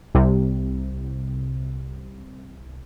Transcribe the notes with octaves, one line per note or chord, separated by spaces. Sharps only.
C2 C3